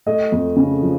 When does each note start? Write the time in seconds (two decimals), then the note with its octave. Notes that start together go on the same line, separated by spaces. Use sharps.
0.06 A3 D#5
0.32 F2
0.56 C#3
0.82 F3